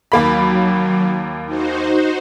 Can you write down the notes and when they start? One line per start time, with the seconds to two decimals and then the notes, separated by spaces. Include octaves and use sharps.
0.12 D#2 F#3 A#3 B5
1.46 D#4 F#4 C5